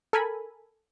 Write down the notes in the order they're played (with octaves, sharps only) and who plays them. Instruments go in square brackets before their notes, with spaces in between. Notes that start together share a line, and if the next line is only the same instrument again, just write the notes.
[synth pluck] A4 A#4 G#5 B5